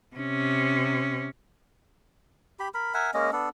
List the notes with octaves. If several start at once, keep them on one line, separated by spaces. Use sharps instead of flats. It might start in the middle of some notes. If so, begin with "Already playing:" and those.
C3 C#4
G4 B5
A#4 B5
A#4 E5 F#5 G#5
G#3 A#3 C#4 D#5
B3 D4 A4